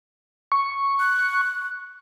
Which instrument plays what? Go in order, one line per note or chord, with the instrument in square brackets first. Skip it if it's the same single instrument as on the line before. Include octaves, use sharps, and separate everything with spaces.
[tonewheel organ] C#6
[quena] F#6